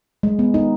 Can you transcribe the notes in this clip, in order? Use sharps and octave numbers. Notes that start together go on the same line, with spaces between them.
G#3
B3
D#4